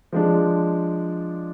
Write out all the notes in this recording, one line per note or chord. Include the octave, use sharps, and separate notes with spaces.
F3 G#3 D4